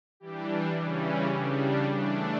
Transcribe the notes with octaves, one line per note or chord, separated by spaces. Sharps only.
E3 G3 D4 G4
C#3 E3 G3 C#4
B4
C#3 G3 D4 A4
G4
E3 A3 D4 G4